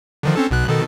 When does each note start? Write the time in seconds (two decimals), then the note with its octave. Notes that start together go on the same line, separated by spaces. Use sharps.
0.23 D3 D#3 F3
0.36 C4 C#4 A4
0.51 B1 B2 F#6
0.67 B2 D#3 A4